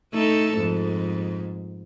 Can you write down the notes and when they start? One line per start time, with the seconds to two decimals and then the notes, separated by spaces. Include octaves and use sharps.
0.13 A3 D#4 A4
0.57 F2 G#2